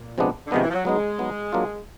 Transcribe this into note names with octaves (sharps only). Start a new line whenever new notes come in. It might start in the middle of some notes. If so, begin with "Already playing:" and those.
Already playing: A#2
C3 F3 G#3 B3 D4
D3
C3 D#3 F3 G#3 B3 D4
E3
F3
F#3
F#3 G#3 B3 D#4
F#3 B3 D#4
F#3 A#3 D4 F4